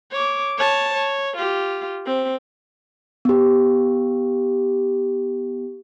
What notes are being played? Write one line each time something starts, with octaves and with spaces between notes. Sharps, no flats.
C#5 D6
C#5 A5
C#5
F4 G4
C4
B3 G4